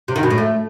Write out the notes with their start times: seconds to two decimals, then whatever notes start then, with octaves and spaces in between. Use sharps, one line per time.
0.08 C3
0.16 D#3
0.23 B2
0.30 A2
0.38 A3